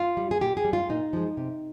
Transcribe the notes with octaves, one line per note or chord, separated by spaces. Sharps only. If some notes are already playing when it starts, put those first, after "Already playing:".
Already playing: F4
G3
G#4
A#2 G4
G#4
G3
F4
A#2 D#4
F3 G#3
C3